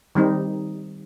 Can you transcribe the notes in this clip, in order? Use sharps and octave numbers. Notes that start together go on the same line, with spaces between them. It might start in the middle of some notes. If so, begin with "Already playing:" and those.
D#3 G3 C4 D#4